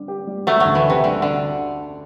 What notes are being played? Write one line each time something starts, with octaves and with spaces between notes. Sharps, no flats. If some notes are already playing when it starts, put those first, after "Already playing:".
Already playing: D3 G3 C4
G4
G3
F#3 G3 A3
D2 F#3
E3
D4
C3
D3 G3
D3 D4